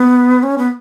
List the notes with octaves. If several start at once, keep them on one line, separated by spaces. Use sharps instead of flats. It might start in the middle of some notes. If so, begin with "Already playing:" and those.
Already playing: B3
C#4
B3